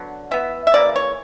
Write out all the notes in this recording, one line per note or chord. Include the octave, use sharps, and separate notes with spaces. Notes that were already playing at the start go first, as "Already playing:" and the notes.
Already playing: D3 F#3 B3
E3 B3 E5
E5
C#3 E3 A#3 D5
C#5